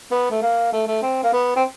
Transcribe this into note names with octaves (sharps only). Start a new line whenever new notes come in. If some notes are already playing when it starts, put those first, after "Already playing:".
B3
A3
A#3
A3
A3
C4
A#3
B3
C4